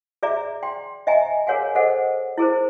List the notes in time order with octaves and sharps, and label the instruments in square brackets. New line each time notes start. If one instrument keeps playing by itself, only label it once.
[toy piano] G#4 D5 E5 A#5
G5 C6
D#5 E5 G5 G#5 A#5
G#4 A#4 C#5 F5 F#5 G#5
G#4 A4 C5 D#5 F#5
E4 G#4 A#4 C5